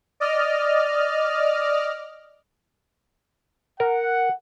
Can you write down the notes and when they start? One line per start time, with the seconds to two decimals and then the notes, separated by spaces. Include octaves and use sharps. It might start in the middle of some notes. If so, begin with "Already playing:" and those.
0.20 D5 D#5 F6
3.80 A#4 F#5